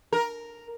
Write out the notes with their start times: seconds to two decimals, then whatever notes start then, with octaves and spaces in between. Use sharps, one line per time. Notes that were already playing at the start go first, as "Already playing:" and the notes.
0.12 A#4